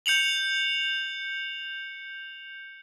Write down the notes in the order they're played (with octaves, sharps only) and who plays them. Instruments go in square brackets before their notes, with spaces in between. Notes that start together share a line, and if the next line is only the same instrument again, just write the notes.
[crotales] G6 C#7 F7 F#7